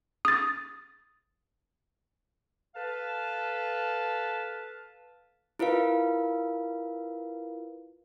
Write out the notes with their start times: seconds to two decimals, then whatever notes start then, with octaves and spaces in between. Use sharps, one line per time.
0.25 D#6 A6
2.75 A4 B4 F5 A5
5.59 E4 F4 A#4 B4 F5